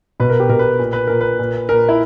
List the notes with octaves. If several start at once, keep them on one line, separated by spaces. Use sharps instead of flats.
B2 B4
A#4
G4
B2 A#4
B4
A#2
B4
A#2 A#4
B4
A#2
A#2 A#4
E4